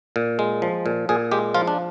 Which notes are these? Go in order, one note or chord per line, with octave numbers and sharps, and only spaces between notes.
A#2
G#3
F3
A#2
A#2 G#4
G#3 G4
F3 F4
D4